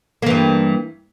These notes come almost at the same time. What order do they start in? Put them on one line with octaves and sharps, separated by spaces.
A#3 E3 G2